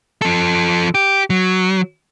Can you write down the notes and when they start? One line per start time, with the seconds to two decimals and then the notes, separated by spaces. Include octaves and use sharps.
0.22 F3 A4
0.95 G4
1.30 F#3